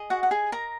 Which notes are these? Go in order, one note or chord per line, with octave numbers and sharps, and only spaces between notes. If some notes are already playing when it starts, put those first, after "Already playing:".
Already playing: G#4 D#5
F#4 F#5
F#5
G#4 G#5
A#4 A#5